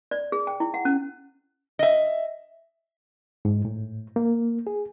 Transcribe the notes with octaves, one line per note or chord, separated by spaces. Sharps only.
D5
G#4
G5
E4
F#5
C#4
D#5 E5
G#2
A2
A#3
G#4